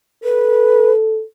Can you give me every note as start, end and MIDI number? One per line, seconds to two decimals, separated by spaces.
0.24 1.23 69
0.24 0.92 71